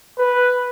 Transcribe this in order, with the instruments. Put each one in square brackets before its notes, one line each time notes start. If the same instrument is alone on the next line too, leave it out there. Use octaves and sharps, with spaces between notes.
[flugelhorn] B4